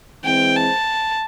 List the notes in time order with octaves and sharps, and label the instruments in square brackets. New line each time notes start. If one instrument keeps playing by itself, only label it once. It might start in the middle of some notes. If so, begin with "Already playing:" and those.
[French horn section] E3 G#3 C4 [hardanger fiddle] G5
[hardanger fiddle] A5